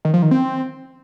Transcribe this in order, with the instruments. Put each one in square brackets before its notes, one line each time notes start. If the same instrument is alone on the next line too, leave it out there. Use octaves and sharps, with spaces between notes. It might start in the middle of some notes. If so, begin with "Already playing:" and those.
[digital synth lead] D#3
F3
D#3
C4